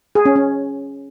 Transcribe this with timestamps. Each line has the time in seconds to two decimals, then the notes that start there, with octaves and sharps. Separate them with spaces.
0.15 G#4
0.25 C#4
0.35 C#4